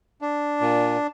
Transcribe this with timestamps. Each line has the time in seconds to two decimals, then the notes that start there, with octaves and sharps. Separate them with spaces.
0.21 D4
0.61 A#2